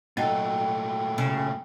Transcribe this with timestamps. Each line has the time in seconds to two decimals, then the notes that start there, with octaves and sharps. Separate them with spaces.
0.17 A#2 F#3 A3 D#4 F#4 G5
1.18 C#3